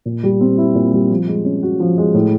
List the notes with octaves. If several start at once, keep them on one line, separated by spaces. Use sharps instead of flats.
A#2
G3
C4
E4
A#2
G3
F3
G#3
C#4
F#4
F3
G#3
A2